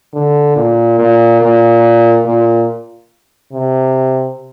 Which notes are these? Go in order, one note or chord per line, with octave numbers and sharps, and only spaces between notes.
D3
A#2
A#2
A#2
A#2
C3